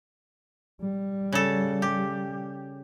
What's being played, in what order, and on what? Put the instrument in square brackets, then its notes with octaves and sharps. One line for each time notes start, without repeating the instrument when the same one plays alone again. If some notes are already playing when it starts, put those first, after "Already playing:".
[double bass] G3
[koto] C#3 A4
G4